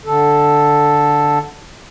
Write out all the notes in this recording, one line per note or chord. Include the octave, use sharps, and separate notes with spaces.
D3 A4